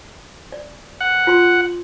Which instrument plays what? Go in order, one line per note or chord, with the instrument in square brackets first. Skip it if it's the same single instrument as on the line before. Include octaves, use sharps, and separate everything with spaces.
[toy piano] D5
[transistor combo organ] F#5
[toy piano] F4 C6